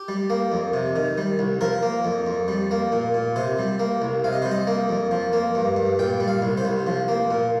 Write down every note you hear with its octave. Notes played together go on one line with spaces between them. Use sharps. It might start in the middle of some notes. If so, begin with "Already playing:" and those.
Already playing: G4
G3
A#3
F2
C3
D#3
G3
C2
F3 A#4
A#3
F2
F2
G3
A#3
A#2
A#2
C3 C5
G3
A#3
C2
C3 F5
D#5
G3 C5
D#5
A#3
F2
F3
A#3
G2
G2
A#2 G5
G3
F5
C2
C5
C2
F3
A#3
A#2